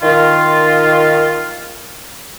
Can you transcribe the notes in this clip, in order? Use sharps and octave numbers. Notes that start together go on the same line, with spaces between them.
D#3 F4